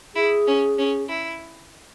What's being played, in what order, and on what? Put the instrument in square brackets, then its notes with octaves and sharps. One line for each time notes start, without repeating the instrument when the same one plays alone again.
[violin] E4 [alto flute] G#4
[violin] C#4
C#4
E4